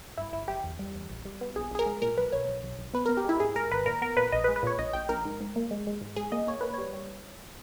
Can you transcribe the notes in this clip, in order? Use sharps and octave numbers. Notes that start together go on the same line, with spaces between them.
G2 E4
G1 E4
G1 G4
E2
G3
E2
A#1
G3
B3
A#1 G#4
A#1 G#4
A#4
G#2
A#2 A#4
B1 B4
B1 C#5
B1
B1
B1
B3 B4
A#4
B3
G4
G#3 E4
G#2 G#4
G#2 A#4
G#1 B4
A#2 A#4
B3 A#4
A#2 B4
A#1 D#5
B4
G#3
B4
A#2 C#5
A#1 D#5
A#1 G5
A#1 A#4
G#2
G#2
A#3
G#3
G#3
G#2
G#2 G#4
A#3 D#5
A#3 C#5
A#3 B4
G3 C#5
G3